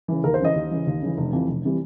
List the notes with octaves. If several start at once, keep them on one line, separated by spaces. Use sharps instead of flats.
C#3 E3
D#2 A#4
C5
C#3 E3 D#5
D#2
C#3 E3
D#2
C#3 E3
F1
F2 C3 E3 G3
F1
C3 E3 G3